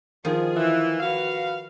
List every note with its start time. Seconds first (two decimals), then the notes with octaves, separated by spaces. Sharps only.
0.25 D#3 F3 F4 G#4
0.56 E3
1.00 F#4 B4 F5